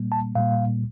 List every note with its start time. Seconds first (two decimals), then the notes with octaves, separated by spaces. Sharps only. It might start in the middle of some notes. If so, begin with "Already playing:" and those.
Already playing: A#2 G3 A#3
0.12 A5
0.35 A#2 G3 A#3 F5